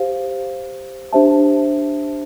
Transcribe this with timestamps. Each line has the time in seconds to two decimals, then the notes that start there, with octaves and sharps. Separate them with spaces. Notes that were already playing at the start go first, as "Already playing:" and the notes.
Already playing: G4 C5 F5
1.13 D4 G4 C5 E5 A5